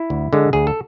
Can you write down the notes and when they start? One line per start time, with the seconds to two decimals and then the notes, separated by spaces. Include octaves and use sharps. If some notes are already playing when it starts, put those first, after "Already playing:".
Already playing: E4
0.10 D2
0.33 D3 G#3
0.53 D2 G#4
0.67 A4